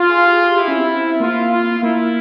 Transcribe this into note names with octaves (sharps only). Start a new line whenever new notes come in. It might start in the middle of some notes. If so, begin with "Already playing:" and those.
Already playing: F4
G#4
G4
G#4
G4
E4 G4
C#4
C4
A#3 F4
F4
A#3 E4